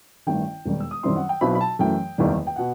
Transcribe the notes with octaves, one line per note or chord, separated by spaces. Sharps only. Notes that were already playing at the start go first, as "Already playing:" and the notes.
A1 G2 D#3 G5
E1 D#2 D#3 G3
E6
D#6
F#2 D#3 G3 C4 E4 C6
F#5
G5
B1 B2 F#3 C4 E4 B5
B5
A5
F#2 E3 A3 G5
F#1 E2 D#3 G3
G5
B2 F#5